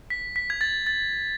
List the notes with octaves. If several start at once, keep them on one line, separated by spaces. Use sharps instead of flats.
B6
B6
G#6
A6
A6